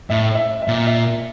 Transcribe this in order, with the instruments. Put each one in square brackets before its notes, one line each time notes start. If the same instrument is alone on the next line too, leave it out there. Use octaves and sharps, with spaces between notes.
[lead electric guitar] A2 [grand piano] E5
[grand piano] E5
E5
[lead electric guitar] A#2
[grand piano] E5